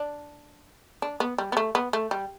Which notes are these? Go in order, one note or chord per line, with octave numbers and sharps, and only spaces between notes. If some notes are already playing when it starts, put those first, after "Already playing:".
Already playing: D4
D4
B3
G3
B3
A3
B3
A3
G3